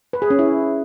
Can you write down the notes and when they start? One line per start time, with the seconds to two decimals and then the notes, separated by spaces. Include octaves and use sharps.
0.13 B4
0.22 G#4
0.30 C#4
0.39 E4